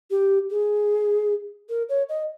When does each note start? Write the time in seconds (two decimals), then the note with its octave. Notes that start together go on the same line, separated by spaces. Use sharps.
0.10 G4
0.51 G#4
1.69 A#4
1.89 C#5
2.09 D#5